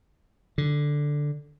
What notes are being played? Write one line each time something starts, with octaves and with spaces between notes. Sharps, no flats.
D3